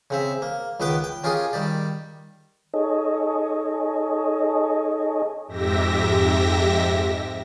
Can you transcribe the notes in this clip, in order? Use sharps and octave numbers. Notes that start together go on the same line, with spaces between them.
C#3 C4 E5
A#3
C#2 D#3 B3 B4 G5 D6
G5
C#4 F4 G4 G#4 A#4 D#5
D#3 G3 G4 D5
D#4 G#4 A4 C#5 D#5
F2 G#2 G4 E5 A#6